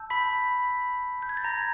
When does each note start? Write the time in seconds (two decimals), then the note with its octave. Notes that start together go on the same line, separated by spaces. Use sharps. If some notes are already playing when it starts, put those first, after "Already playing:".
Already playing: A5 E6 G6
0.10 B5 B6
1.22 G6
1.29 G#6
1.37 A6
1.44 A#5 A#6